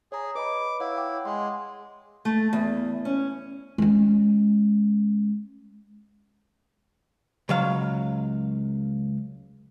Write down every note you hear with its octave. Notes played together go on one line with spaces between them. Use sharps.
G#4 C#5 A#5
B4 D#5 B5 D6
E4 C#5 F5 F#5
F#5 G5 D6
G#3 C6
A3
E2
C#4
G#3 C#4
C#2 F#3 F5